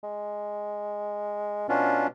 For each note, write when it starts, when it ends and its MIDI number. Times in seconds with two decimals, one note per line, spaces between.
0.03 1.66 56
1.69 2.07 47
1.69 2.07 61
1.69 2.07 62
1.69 2.07 65